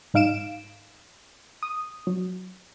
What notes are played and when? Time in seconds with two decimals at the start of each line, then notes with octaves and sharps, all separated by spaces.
0.14 G#2 D#4 F5 D7 E7
1.63 D#6
2.07 F#3